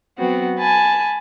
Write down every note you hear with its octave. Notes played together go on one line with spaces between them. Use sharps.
F#3 B3 C4 F#4
G#5 A5 B5